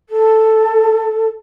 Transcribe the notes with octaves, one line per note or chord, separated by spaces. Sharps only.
A4